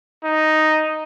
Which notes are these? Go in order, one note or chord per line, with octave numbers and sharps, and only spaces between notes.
D#4